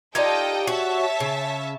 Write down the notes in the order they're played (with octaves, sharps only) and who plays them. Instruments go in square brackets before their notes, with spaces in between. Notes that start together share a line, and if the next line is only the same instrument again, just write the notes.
[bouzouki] D#4 F4 G4 [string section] A4 D#5 G5 [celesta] D5 G#6
[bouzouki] F#4 [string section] C#5 E5 A5
[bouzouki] C#3